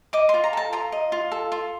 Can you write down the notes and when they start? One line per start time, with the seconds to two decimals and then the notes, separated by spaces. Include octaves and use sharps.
0.13 D#5 D6
0.29 F4 C6
0.44 A#5
0.53 A4 A5
0.73 F4 A#5
0.92 D#5
1.12 F4
1.32 A4
1.52 F4